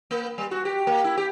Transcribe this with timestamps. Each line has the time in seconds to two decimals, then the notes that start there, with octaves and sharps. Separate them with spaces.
0.11 A#3
0.38 G3
0.51 F#4
0.65 G4
0.87 A#3
1.04 E4
1.17 G4